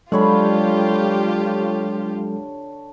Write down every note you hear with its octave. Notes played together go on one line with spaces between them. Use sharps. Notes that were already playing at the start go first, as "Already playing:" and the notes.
D3 F#3 G#3 F4 G4 A4 C#5 B5